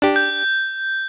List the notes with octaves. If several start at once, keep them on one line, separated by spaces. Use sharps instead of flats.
D4 G4
G6